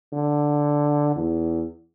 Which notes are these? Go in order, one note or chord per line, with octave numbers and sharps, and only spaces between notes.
D3
E2